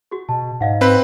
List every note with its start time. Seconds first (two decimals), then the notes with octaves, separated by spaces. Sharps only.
0.11 F#4 G#4
0.29 B2 A5
0.61 G#2 D#5 F5 F#5
0.81 C4 B4